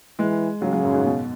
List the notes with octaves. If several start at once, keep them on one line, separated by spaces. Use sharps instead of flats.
E3 G#3
C#3 F#3
F#3
F#2
G#2
B2